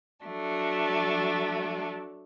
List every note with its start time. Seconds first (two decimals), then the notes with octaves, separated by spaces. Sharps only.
0.24 F#3 A3 D4